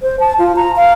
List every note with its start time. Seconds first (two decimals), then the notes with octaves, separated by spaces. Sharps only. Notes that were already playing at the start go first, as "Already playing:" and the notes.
0.03 C5
0.20 A5
0.39 F4
0.56 A#5
0.76 F5